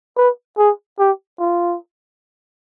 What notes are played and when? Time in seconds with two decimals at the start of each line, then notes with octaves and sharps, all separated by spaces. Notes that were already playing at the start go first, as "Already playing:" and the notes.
0.16 B4
0.58 G#4
0.99 G4
1.39 F4